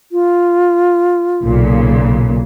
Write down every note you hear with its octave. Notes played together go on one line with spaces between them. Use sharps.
F4
B1 A#2 C#3